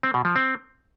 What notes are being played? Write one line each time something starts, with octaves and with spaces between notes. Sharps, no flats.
C4
B2
F3
C4